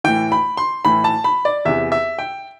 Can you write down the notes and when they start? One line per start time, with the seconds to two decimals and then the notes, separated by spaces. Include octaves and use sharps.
0.04 A2 E3 G5
0.32 B5
0.57 C6
0.85 A2 E3 B5
1.04 A5
1.24 B5
1.45 D5
1.65 E2 C3 E3 E5
1.92 E5
2.19 G5